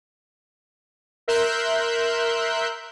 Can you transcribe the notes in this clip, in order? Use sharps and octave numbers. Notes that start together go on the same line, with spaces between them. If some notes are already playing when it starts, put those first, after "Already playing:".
A#4 E5 C6 E6 F#6 G6